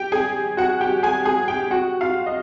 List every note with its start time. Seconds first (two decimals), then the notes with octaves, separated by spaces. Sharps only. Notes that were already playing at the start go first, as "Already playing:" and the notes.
Already playing: G4 G5
0.12 G#4 G#5
0.57 F#4 F#5
0.81 G4 G5
1.03 G#4 G#5
1.25 G#4 G#5
1.48 G4 G5
1.71 F#4 F#5
2.01 F4 F5
2.26 D#5